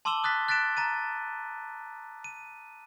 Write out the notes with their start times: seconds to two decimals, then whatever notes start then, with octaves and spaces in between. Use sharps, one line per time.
0.05 A5 C6 D6 E6 E7 G7
0.24 D#6 F#6 A6 B6
0.48 F#6 A6 B6 D7 E7
0.77 A#5 A6 D#7
2.24 D#7